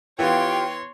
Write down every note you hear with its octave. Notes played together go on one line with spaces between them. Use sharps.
E3 B3 F4 G4 C#5 F5 G5 C6